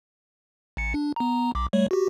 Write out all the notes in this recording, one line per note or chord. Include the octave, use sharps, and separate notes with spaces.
A1 C#7
D4
B3 A#5
B1 D6
G3 A3 C#5
F#4 G4